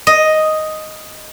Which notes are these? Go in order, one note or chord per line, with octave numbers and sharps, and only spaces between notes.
D#5